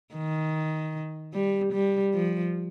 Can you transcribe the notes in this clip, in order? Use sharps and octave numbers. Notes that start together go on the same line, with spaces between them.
D#3
G3
G3
F3